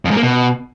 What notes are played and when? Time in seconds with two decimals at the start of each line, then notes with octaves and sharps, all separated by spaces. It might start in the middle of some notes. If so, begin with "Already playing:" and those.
0.05 F2
0.11 G#2
0.17 A#3
0.23 B2